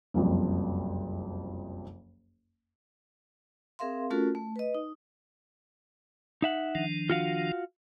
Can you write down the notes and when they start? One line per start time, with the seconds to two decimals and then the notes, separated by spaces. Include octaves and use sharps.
0.14 F#1 C2 F2
3.79 C4 G#4 A#4 E5 F5 C6
4.10 A3 C#4 F4 F#4 A4 A#4
4.35 A3
4.56 B4 D#5
4.75 D#4
6.42 D#4 E5 F#5
6.75 D#3 F3 D4
7.10 F4 F#4 F5